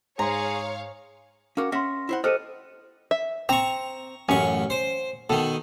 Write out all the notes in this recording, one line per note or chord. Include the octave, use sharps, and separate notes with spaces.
G#2 G#4 C5 C#5 F5 A#5 C6
C#4 F#4 A#4 F5 F#5 D6
C#4 E5 F#5 C6 A#6
E4 C5 F#5
G4 A4 C5 D#5 F6 C#7 D#7
E5
C4 A#5 C#6
A1 F#2 C#4 C#6
C5
B2 D#3 A4